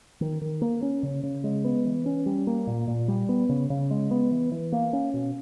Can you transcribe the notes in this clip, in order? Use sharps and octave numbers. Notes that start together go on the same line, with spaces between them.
D#3
D#3
A#3
C#4
C#3
C#3
G#3
B3
E3
C#4
G3
A#3
A#2
A#2
G3
B3
C#3
C#3
G#3
B3
E3
E3
A#3
C#4
B2